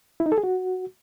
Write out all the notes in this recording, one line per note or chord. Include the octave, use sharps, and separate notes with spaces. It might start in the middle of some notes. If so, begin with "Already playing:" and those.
E4
D#4
A4
G#4
F#4